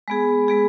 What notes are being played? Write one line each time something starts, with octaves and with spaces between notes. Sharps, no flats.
G#3 B3 G#4
G#3 B3 G#4